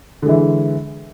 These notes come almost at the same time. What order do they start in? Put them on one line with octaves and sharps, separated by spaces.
D3 G#3 E3